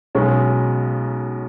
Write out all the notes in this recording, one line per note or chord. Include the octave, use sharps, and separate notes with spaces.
B1 B2 G#3 C#4